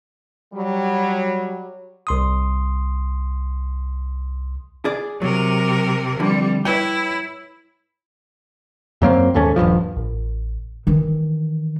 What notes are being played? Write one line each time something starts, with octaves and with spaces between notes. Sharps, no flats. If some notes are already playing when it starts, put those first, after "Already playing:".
F#3 G3
C2 C6 D#6
G#4 D5
C3 F#3 A#4
F2 D3 E3 G3
E4 B4 C#5 G5
F#2 F#3 A#3 C4
D#2 G#2 A3 C#4
D#1 C#2 G2 F3
A1
D#3 E3